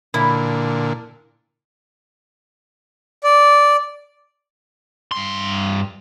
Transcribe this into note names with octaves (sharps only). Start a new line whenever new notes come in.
A#2 D3 E4
D5
G2 C6